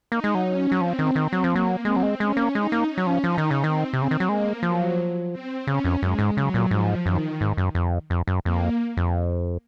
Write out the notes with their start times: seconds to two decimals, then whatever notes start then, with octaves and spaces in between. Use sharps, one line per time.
0.12 A#3 D#4
0.24 G#3
0.35 F#3
0.47 C#4
0.72 F#3
0.81 F3 C4
0.99 D#3
1.16 D#3 C4
1.33 F#3
1.44 F3
1.50 A#3
1.56 F#3
1.85 G#3 C4
1.96 F#3
2.03 G#3
2.20 G#3 C#4
2.37 A#3
2.55 G#3 D#4
2.72 A#3
2.90 C#4
2.97 F#3
3.07 F3
3.24 F3 D#4
3.38 D#3
3.51 C#3
3.59 C4
3.64 D#3
3.93 C3 C4
4.02 C#3
4.11 D#3
4.20 F#3
4.28 G#3 A#3
4.63 F3 F#3
5.32 C4
5.67 C#3 C#4
5.84 F2
6.02 F#2 G#3
6.19 G#2
6.37 C#3 F#3
6.54 A#2
6.71 G#2 F3
7.06 F#2 D#3
7.41 G#2
7.57 F#2
7.75 F2
8.10 F2
8.27 F#2
8.45 F2 A#3
8.97 F2